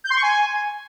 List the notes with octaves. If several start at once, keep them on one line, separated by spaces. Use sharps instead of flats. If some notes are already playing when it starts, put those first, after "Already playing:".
G6
C6
C#6
G#5